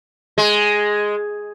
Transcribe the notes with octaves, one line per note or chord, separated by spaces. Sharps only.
G#3